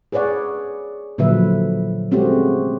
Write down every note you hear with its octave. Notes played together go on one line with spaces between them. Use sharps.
G#4 B4 C#5 D5 F#5
A#2 D3 F3 F#3 B4 E5
G#3 A3 C4 C#4 F#4 G4